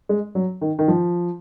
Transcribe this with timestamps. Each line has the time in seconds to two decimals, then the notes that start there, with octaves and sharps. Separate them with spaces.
0.09 G#3
0.35 F#3
0.61 D#3
0.79 D#3
0.88 F3